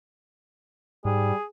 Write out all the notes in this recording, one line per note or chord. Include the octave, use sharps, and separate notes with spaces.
G#2 G3 G#4